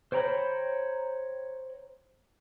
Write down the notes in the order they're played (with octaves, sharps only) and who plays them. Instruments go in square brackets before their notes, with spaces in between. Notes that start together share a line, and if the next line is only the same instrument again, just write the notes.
[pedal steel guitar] C5 C#5 G5 A#5 B5